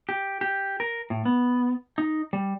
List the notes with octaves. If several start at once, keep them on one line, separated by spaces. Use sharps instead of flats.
G4
G4
A#4
A2
B3
D#4
G3